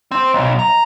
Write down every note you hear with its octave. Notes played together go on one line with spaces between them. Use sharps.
C4
B1
A#5